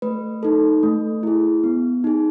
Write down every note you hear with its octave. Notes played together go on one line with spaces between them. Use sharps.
A3 B4
D#4 A4
A3
E4 G#4
B3
D#4 G#4